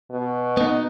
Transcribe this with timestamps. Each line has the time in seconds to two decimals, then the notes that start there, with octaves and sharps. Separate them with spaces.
0.11 B2
0.57 B3 D#4